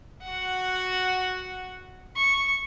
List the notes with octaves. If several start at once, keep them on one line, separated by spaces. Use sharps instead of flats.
F#4 F#5
C#6